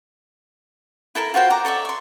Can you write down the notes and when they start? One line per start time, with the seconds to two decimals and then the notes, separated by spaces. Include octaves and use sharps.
1.15 E4 A4 A#4 A#5
1.34 F4 F#4 C5 G5
1.50 A#5 D6
1.65 A4 C#5 D5 E5
1.85 C6 C#6